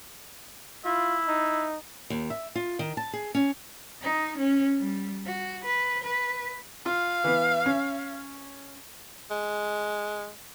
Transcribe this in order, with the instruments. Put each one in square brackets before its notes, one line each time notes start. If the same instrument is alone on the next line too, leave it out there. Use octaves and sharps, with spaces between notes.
[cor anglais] E4 [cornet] F4
[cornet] D#4
[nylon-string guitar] D#2
E5
F4
D#3
A5
G#4
C#4
[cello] D#4
C#4
G3
F#4
B4
B4
[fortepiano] F4 [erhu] F5
[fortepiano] E3 B3
C#4
[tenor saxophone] G#3